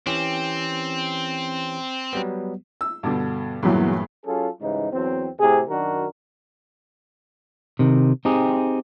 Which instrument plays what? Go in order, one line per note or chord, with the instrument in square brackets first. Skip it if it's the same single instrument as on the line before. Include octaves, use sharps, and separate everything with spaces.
[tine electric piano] E3 C#4 G4 [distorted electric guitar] C4
[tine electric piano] F#3 G3 B3
[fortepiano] E6
G2 B2 D3
[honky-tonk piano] E2 F#3 [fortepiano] G2 A#2 E3
[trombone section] F#3 C#4 F4 G#4 A4
G#2 C#3 E3 G3 D#4
E2 F#3 C4
A2 C3 C4 G#4
F#2 D#3 D4 F#4 A#4
[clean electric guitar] C3 D#3
C4 D#4 G4 G#4